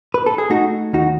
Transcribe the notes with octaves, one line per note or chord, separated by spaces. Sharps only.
B4
A4
G#4
A3 D#4 F#4
D#2 D#4 F#4